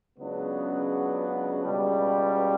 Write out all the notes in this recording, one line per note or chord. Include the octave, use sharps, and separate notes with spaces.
C#2 C#3 F#3 B3 D4
C#2 B2 G3